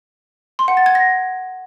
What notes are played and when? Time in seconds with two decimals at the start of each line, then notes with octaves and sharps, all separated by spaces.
0.59 C6
0.68 F#5
0.77 A6
0.86 G#6
0.95 A#6